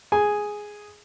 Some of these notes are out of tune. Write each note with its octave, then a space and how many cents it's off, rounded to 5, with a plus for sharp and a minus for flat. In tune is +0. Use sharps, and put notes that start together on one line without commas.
G#4 +0 G#5 +0